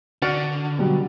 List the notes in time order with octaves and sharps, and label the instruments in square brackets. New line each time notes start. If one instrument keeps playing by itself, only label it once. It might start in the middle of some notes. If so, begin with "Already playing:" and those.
[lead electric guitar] D3 [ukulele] F#4 D5 F#5 [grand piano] F6
[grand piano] B2 F#3 G3